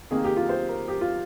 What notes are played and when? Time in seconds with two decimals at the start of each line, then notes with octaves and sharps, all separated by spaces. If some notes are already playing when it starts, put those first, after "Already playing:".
0.11 C3 D#3 A#3 G#4
0.24 G4
0.37 F4
0.49 C5
0.69 A#4
0.88 G4
1.01 F4